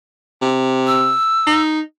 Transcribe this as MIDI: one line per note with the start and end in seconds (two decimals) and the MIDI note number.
0.42 1.13 48
0.87 1.62 88
1.47 1.81 63